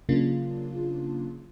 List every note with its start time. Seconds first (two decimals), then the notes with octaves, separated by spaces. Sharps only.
0.09 C#3 F#3 A#3 D4 F4